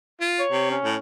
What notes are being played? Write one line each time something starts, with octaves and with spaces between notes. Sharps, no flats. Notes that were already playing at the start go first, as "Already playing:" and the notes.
F4
C#5
C3
C#4
A2